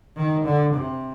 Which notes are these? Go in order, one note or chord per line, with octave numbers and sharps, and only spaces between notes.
D#3
D3
C3